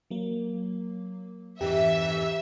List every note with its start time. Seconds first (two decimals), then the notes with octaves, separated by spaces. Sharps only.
0.10 F#3 A#3
1.61 F2 G#2 E3 G4 E5